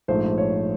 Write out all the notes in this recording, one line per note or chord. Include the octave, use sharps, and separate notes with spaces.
A#1 G#2 F3 A3 C5
C#5